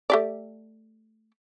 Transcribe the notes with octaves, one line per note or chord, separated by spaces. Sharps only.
A3 G4 D5